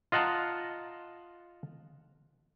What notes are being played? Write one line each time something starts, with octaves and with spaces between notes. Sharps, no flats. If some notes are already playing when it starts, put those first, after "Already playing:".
F4 D#5 F#5 A5 A#5